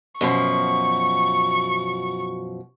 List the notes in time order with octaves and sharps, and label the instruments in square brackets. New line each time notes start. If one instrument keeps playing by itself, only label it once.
[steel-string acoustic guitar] F#2 B2 F3 [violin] C#6